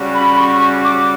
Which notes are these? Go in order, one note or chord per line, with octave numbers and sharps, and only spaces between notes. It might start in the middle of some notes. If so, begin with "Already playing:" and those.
Already playing: C#3 G3 C#4 F#4
B5
C#6
D6